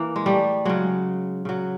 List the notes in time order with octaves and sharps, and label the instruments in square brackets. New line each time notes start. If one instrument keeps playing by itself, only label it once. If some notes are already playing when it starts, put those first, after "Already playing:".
Already playing: [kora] E3 A#3
G#3
G3 A3
C#3 F#3 G#3
C#3 F#3